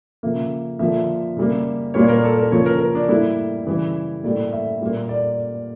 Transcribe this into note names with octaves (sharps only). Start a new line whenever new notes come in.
C#3 F3 A#3 E5
D3 F3 A#3 E5
C#3 G3 A#3
A#2 G3 A#3 C#5
A#4
A4
A#4
C#3 F3 A#3 C#5
A#4
A#4
D4
A2 G3 A#3 E4
C#3 E3 G3
A2 G3 A#3 D5
E5
A#2 G3 A#3
D5